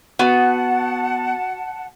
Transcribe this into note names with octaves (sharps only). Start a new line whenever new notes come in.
B3 F#4 F#5 A5